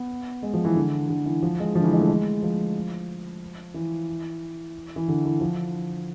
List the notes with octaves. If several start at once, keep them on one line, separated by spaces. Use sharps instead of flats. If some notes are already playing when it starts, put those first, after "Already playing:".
Already playing: B3
G#3
F3
E3
D3
D3
E3
F3
G#3
F3
D3
E3
G#3
A3
G#3
F3
E3
E3
D3
E3
F3